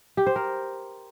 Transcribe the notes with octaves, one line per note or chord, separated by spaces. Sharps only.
G4
C5
A#4